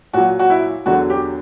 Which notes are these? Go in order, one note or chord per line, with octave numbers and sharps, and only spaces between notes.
A#2 F#3 F#4
F#4
E4
E2 D3 F#3 F#4
G4